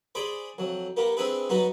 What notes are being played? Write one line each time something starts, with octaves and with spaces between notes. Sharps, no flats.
G#4 C5 D5 B5 D6
F2 F#3
A#3 B3 G4
C4 D4 E4 G#4 B4
F#3 B3 D#4 F#4 B4